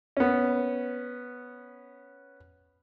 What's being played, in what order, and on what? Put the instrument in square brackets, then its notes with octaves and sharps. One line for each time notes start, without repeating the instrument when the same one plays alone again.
[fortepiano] B3 C#4